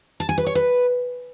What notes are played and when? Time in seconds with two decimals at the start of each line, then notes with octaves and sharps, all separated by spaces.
0.20 A5
0.29 G#5
0.38 B4
0.46 C#5
0.55 B4